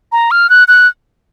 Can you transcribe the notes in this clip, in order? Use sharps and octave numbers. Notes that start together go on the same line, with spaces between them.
A#5
F6
F#6
F#6